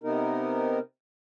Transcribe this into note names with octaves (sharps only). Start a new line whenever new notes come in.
C3 B3 D#4 A#4